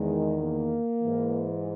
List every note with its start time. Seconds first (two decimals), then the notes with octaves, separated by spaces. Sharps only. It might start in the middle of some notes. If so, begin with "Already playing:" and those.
Already playing: E2 D#3 G#3
0.42 A#3
1.03 G#2 E3